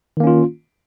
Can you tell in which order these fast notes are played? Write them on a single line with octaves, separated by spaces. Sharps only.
D#3 A#3 C#4 F4